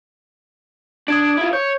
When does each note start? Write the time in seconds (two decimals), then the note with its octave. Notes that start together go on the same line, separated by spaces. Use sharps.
1.08 D4 D#6 G#6 D7
1.37 E4 F4
1.53 C#5 G6